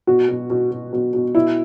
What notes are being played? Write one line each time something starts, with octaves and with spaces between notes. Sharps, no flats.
B2 F#4
B2
B2
B2
B2
B2
B2 E4